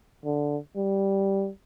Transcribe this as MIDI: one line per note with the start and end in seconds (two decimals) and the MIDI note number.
0.24 0.57 50
0.76 1.50 55